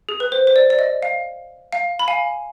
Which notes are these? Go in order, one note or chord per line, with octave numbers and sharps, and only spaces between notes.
G#4
B4
C5
C5
D5
D5
D#5
F5
F5
B5
F5 G#5